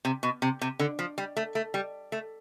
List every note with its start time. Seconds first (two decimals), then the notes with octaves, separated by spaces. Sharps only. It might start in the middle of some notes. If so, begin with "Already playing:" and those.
0.05 C3
0.23 B2
0.42 C3
0.61 C3
0.79 D3
0.99 F3
1.18 G3
1.37 A3
1.55 A3
1.74 G3
2.12 A3